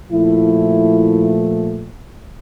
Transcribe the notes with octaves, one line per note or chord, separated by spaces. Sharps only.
A#2 F3 A3 E4